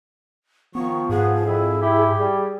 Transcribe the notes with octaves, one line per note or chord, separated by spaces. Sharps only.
D#3 F3 B3 C#6
G#2 B3 G#4
F2 E4
E4 G4
G3